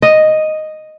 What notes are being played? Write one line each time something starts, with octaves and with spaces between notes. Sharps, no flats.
D#5